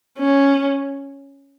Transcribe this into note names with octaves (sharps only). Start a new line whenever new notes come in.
C#4